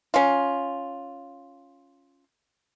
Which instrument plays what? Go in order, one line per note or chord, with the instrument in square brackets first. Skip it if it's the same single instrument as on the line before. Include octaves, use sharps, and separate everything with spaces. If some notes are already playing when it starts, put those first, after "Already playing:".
[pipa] C#4 F4